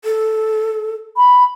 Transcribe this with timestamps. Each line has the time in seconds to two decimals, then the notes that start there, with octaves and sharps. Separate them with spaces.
0.05 A4
1.17 B5